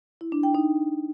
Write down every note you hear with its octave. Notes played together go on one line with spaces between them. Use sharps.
E4
D4
G5
D#4